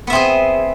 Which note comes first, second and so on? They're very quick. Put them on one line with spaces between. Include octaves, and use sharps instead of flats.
B3 E5 C4 G#4